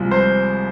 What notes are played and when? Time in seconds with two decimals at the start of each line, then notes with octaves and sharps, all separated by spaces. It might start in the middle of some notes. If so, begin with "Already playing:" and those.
Already playing: C2 C3 F3 G#3
0.11 C5